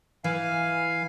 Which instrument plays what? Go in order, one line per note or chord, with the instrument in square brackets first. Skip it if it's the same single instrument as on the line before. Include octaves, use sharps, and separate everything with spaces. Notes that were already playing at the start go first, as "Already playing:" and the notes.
[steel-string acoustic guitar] E3 [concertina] F5 G#5